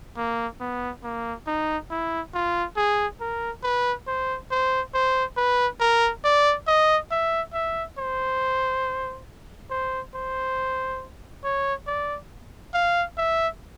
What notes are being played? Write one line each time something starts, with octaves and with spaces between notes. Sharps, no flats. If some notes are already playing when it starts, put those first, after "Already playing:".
A#3
B3
A#3
D#4
E4
F4
G#4
A#4
B4
C5
C5
C5
B4
A#4
D5
D#5
E5
E5
C5
C5
C5
C#5
D5
F5
E5